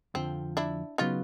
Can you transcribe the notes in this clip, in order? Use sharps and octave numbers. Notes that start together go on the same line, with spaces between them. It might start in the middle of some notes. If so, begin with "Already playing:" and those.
F2 D3 F3 C4
D4 E4
C#3 F#3 B3 D#4 F4